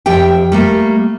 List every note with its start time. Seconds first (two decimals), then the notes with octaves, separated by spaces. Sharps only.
0.06 F2 G4 E5 G5
0.52 G3 A3 A#3